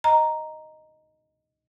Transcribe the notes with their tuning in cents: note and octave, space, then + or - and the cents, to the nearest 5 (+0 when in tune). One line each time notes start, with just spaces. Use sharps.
D#5 +0 A#5 +0